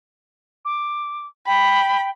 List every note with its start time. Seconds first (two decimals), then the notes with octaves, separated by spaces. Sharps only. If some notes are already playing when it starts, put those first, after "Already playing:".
0.65 D6
1.47 G5 B5